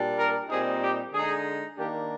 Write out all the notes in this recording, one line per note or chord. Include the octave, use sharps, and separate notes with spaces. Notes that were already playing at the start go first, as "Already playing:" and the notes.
Already playing: A#2 G3 D4
A#4
A#2 G3 C4 D#4 G#4
G4
D3 G#3 D#4 G#4
D#3 A#3 D4 G4